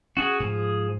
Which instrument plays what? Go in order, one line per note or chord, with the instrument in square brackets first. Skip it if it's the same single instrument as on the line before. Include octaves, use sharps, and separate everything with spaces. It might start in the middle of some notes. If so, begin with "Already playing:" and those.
[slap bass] C#4 [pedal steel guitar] F#4 G#4
[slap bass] G#2 [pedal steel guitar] F3 G#4